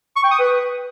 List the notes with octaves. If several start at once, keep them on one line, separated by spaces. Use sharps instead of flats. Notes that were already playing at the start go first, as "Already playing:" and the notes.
C#6
G5
D#6
B4